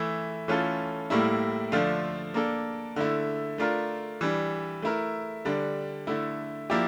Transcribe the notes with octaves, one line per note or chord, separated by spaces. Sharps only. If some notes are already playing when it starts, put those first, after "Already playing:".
Already playing: E3 A3 E4
E3 A3 C#4 F4 A4
A2 G3 A#3 E4
D3 F3 A3 D4 F4
A#3 D4 A4
D3 A3 E4
A3 D4 F4 A#4
E3 G3 D4
A3 E4 A#4
D3 G3 D4
D3 A3 E4
F3 A#3 E4 G4 D5